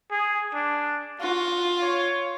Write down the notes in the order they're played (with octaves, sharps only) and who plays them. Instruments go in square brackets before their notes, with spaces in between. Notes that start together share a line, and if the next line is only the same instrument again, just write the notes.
[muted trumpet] G#4
D4
[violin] F4 [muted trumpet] F#4
[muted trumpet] C#5